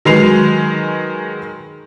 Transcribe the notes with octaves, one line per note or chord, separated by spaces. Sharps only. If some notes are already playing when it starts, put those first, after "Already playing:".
D#3 F#3 G#3 B4 C7 F7